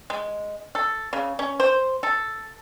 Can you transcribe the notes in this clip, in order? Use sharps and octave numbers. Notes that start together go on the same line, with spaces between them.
G#3
A4
C#3
C#4
C5
A4